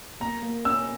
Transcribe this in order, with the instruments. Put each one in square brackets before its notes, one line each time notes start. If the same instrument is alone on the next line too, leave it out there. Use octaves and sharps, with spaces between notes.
[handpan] A#3 [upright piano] A#5
[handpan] A#3
[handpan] C#4 [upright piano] E6